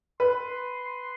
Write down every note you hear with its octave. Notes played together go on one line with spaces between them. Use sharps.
B4 C6